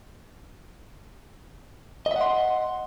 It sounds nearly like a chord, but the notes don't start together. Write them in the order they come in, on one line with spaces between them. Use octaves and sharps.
D#5 E5 F#5 C6